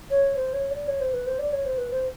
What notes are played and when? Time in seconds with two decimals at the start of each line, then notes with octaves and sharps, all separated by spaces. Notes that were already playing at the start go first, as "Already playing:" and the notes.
0.10 C#5
0.36 C5
0.53 C#5
0.71 D5
0.87 C#5
1.01 C5
1.13 B4
1.27 C5
1.39 D5
1.52 C#5
1.65 C5
1.78 B4
1.91 C5